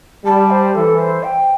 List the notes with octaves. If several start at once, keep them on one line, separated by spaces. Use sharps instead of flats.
G3 A5
C5
E3 A4
C5
G5